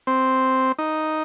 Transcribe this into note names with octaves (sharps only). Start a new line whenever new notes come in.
C4
D#4